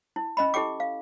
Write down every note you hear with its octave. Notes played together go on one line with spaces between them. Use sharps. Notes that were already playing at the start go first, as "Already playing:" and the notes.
E4
C#4 D#5 B5
E4 G4 A4 G5 D6
F5